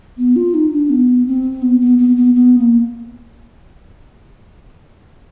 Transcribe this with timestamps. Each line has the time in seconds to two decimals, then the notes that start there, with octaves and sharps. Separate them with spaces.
0.17 B3
0.35 F4
0.54 D#4
0.72 D4
0.89 B3
1.26 C4
1.62 B3
1.80 B3
1.98 B3
2.16 B3
2.34 B3
2.58 A#3